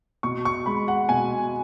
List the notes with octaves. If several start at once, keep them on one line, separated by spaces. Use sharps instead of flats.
B2 C#6
C#6
G#3 B5
F#5
B2 G#5